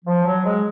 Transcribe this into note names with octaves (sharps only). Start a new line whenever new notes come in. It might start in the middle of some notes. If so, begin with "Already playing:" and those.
F3
F#3
G#3